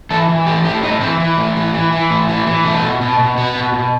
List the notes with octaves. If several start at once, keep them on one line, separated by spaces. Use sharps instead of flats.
E3 A4
E3
A2 G4
A2 G4
A2 D#4
E3 C4
E3
A2
E3
E3
E3
A2
E3
E3
B2 A3
B2
B2
B2
B2 B3
B2
B2